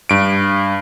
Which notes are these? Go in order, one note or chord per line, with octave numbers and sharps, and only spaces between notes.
G2 D7